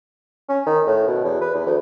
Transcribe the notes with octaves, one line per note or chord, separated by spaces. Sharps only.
C#4
D#3
A2
B2
E2
B4
E2
D2